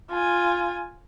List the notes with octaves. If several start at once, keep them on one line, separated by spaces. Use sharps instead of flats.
F4 G#5